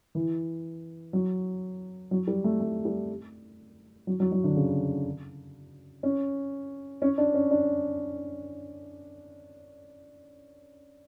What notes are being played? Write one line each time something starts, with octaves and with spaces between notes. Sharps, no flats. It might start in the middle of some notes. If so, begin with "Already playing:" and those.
E3
F#3
F#3
G3
A3
A3
G3
F#3
F#3
F#3
D3
C#3
C#4
C#4
D4
C#4
D4